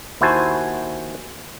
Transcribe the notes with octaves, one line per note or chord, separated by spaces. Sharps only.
D#2 E4 F#4 C5 G#5 A5